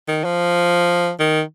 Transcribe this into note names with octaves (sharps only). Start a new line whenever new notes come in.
D#3
F3
D#3